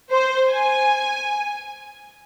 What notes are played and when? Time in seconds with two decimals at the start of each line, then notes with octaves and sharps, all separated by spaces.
0.12 C5
0.49 G#5